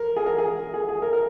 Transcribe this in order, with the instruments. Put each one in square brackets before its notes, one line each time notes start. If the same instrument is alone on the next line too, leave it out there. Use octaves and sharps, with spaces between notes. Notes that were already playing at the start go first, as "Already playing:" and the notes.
Already playing: [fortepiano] A#4
G#4
A#4
G#4
G#4
G#4
A#4
A#4